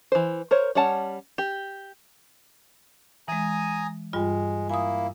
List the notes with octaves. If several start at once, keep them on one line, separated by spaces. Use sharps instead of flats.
E3 C5
A#4 C5 C#5
G3 C#4 C#5 F#5 A5
G4
E3 G#3 G#5 A#5 D#6
G2 G3 G#3 F4
A#3 E4 G#5 D#6